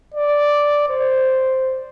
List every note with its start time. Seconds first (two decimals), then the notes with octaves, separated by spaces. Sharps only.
0.14 D5
0.89 C5